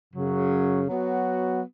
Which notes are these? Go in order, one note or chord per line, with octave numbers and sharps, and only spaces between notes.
F#2 C#3 F#3
F#3 B3 F#4